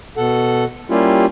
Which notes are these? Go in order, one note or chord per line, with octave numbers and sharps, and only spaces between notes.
B2 A4 F#5
G3 A#3 C#4 E4 F4 G4